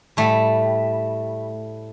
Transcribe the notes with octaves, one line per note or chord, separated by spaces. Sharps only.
A2 G3 A3